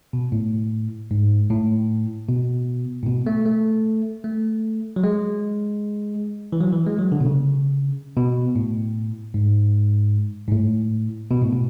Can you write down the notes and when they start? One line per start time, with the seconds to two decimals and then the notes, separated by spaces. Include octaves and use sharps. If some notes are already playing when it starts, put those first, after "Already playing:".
0.13 B2
0.32 A2
1.11 G#2
1.50 A2
2.29 B2
3.03 A2
3.06 B2
3.26 A3
3.46 A3
4.24 A3
4.96 F#3
5.04 G#3
6.53 E3
6.60 F#3
6.73 E3
6.87 G#3
6.99 F#3
7.12 D3
7.21 B2
7.26 C#3
8.17 B2
8.56 A2
9.34 G#2
10.48 G#2
10.52 A2
11.31 B2
11.42 A2
11.52 B2